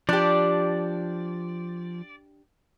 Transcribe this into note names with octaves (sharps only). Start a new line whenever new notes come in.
F3 D4 G4 D5